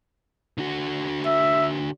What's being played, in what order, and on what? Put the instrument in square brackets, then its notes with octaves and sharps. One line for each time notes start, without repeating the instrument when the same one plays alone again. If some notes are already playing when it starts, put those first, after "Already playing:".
[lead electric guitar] D3 F#4
[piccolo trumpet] E5